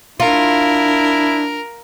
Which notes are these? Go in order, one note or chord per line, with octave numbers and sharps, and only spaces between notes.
D4 E4 F4 A#4